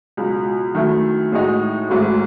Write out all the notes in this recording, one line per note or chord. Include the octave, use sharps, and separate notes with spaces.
C#2 B2 F#3
F#2 D#3 F#3 A3 E4
A2 G#3 D#4 F#4
G#1 G#2 F#3 A3 E4